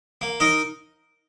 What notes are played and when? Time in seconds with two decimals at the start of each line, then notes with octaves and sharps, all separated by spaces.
0.21 A#3
0.40 D#4 A#4 D#5